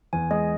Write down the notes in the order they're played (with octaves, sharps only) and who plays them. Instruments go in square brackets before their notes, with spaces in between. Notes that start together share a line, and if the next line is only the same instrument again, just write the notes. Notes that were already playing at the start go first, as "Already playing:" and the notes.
[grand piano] E2 [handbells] G#5
[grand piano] G#3 [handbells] D#5